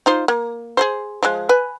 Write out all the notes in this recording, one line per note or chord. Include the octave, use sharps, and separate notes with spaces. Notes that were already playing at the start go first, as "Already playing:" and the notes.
D#4 F4 C5
A#3
G#4 A4 C5
F3 G#3
B4 G#5